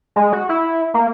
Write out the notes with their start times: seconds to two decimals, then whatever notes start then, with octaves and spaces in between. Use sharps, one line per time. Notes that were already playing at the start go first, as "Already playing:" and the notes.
0.16 G#3
0.33 F#4
0.49 E4
0.94 A#3